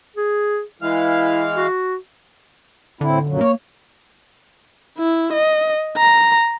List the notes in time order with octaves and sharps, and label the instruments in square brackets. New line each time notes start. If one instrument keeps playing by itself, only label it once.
[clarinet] G#4
[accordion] E3 G#3 F5 [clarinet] E4
[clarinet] F#4
[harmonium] A2 C4 E4 [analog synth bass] D3
[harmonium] F#2 A#2 F#3
[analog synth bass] A#3 [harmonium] C#5
[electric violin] E4
D#5
A#5